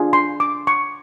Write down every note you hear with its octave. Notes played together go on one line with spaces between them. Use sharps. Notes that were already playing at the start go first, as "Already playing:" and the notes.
Already playing: D4 F4 G#4
C6
D6
C#6